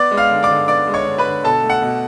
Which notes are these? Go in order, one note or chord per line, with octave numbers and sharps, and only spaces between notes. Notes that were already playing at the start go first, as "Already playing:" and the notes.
Already playing: B3 D5 D6
G#3
F5 F6
D3
D5 D6
D3
B3 D5 D6
G#3
C#5 C#6
D3
B4 B5
D3
B2 A4 A5
A3
F#5
B2